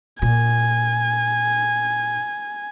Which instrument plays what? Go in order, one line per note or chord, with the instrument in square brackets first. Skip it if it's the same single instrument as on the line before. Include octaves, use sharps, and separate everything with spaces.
[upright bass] A#2 [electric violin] G#5